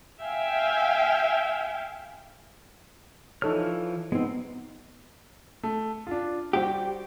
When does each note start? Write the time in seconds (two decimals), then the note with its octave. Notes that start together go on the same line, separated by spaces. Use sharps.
0.22 E5 F5 G5 G#5
3.42 E3 F3 D#4 A4 C#5 F6
4.12 G#3 B3 C4 D#4
5.63 A3
6.07 D4 F4
6.53 G3 F#4 G4 C5